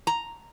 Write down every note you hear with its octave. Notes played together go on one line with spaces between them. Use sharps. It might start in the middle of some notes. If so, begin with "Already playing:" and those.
A#5